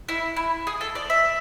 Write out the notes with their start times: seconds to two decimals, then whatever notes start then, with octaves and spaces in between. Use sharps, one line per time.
0.09 E4
0.36 E4
0.67 G#4
0.81 A4
0.95 D5
1.10 E5